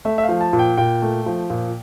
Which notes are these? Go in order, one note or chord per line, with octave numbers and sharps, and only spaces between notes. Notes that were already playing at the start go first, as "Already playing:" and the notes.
A3 E5
E5
F5
F3
A5
A#2
G5
A#2 G5
A3
F3
A#2